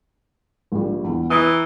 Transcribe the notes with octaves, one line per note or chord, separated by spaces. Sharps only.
A#1 G3
E2
E3 A#5 D#6